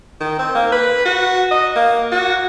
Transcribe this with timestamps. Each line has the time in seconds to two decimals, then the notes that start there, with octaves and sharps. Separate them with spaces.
0.21 D#3
0.39 C4
0.55 A#3
0.72 B4
1.05 F#4
1.51 D#5
1.76 A#3
2.12 F#4